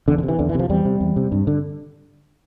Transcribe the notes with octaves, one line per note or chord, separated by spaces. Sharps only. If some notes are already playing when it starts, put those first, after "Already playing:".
E2 D3
D3
C3
E3
E2 D3
E3
C3 F3
E2 G3
C3
E2
C3
G2
D3